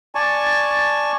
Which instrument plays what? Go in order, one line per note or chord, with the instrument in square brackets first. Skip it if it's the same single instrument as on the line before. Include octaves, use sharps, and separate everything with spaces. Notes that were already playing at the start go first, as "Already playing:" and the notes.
[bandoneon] D5 G#5 A5 C#6